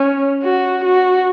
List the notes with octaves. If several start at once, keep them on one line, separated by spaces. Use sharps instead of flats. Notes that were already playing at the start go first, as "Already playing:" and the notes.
Already playing: C#4
F#4
F#4